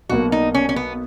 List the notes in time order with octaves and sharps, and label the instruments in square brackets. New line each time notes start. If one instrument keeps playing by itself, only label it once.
[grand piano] B1 B2 A#3 [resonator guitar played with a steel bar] F#4
[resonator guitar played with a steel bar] D#4
C#4
C#4
B3